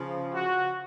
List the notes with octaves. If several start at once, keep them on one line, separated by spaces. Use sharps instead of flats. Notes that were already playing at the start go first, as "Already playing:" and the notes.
Already playing: C#3 F3
F#4